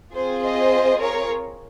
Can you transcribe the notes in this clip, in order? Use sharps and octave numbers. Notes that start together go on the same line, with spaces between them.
C4 F4 G#4 C5
C5 D#5
A#4 C#5